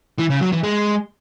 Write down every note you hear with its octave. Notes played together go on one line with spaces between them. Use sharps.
E3
C#3
F#3
E3
G#3